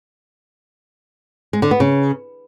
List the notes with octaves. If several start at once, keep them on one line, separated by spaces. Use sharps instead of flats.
G#3
D3
B3
C#3